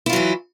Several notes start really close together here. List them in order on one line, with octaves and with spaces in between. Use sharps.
E4 F4 F#3 E3